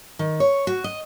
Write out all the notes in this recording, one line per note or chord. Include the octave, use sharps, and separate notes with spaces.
D#3
C#5
F#4
D#5